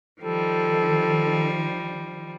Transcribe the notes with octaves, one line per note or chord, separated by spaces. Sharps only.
D#3 F3 G3 A4